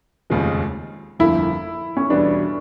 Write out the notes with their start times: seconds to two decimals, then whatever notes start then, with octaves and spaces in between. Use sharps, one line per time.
0.30 F1 D#2 C#3 F3 G#3
1.19 G1 F2 D3 F3 A#3 E4
1.97 C#4
2.10 E2 B2 G3 B3 D4